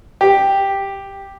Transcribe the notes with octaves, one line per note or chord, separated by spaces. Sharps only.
G4